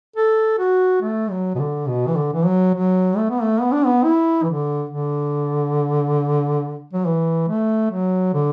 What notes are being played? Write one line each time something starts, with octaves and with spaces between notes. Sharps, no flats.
A4
F#4
A3
F#3
B2
D3
B2
E3
D3
E3
F#3
F#3
A3
B3
A3
B3
D4
B3
E4
E3
D3
D3
F#3
E3
A3
F#3
D3